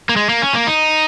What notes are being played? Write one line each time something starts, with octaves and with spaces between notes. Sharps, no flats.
A#3
G#3
A#3
C#4
A#3
D#4